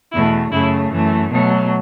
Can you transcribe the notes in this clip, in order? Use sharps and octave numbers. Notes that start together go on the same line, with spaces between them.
E2 B2 A3 E4
F#2 C#3 A3 E4
F#2 E3 A3
B2 F#3 A3